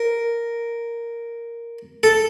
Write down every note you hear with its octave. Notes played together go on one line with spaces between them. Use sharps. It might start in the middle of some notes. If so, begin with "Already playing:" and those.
Already playing: A#4
A4